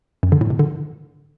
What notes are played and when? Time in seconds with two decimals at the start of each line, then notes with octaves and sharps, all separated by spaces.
0.23 F#2
0.32 D3
0.41 A2
0.50 C3
0.59 D3